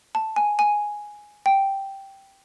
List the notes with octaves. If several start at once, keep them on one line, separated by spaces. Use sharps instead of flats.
A5
G#5
G#5
G5